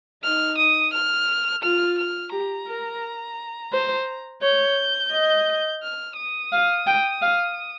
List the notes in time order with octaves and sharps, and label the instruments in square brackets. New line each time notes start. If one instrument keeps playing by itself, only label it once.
[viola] D#4 [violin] F6
[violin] D#6
F6
[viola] F4 [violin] F6
[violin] F6
[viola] G4 [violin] A#5
[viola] A#4
C5
[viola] C#5 [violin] G6
[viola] D#5
[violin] F6
D#6
[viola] F5
G5
F5